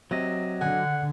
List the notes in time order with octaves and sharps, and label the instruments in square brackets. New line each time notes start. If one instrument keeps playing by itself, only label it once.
[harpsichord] C3 [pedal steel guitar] F#3 D#5
[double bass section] D3 [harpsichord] G#4 [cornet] F#5